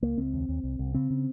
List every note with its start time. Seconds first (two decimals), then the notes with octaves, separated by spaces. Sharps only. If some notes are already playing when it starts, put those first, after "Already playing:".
0.02 C#2 A#3
0.18 C#2 C4
0.33 D#2
0.49 D#2
0.64 C2
0.79 C2
0.94 C#3 C4
1.10 C#3